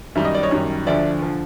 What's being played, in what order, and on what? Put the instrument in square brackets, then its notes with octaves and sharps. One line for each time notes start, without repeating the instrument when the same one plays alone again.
[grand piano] F#2 D#3 G3 E5
D#5
D5
C#5 D#5
F#2 D#3 G3
D2 D3 F3 D5 E5
D3 F3